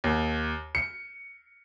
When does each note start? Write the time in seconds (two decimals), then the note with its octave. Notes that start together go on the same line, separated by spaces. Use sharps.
0.04 D#2
0.75 C#7